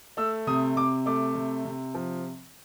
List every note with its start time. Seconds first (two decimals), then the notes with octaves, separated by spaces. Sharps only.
0.17 A3 E6
0.47 C3 D#6
0.76 C3 D6
1.06 A3 D6
1.35 C3
1.65 C3
1.94 F3